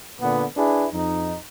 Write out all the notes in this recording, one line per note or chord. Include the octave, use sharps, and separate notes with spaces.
A#2 D3 B3
D4 E4 G#4 B4
F2 D#4